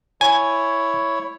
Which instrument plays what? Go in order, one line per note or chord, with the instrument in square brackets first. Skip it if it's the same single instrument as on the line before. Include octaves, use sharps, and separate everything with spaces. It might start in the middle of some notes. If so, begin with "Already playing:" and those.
[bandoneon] E4 C#5 [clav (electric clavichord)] G#5